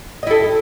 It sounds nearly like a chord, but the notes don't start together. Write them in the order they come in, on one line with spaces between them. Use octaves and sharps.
D#5 E4 A4